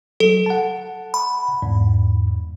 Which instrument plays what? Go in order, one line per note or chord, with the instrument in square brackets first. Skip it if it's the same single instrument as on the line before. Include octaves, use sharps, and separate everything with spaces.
[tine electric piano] F#3 [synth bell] A4
[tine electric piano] F#5 A5
[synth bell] B5
[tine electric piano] E2 G#2